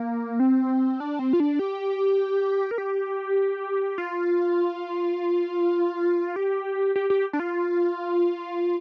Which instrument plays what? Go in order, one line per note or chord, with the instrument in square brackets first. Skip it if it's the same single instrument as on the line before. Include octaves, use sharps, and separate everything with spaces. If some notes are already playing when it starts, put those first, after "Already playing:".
Already playing: [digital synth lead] A#3
C4
D4
C4
F4
D4
G4
A#4
G4
F4
G4
G4
G4
D4
F4